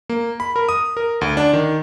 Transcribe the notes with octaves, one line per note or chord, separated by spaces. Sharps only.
A#3
B5
A#4
D#6
A#4
D2
D4
D#3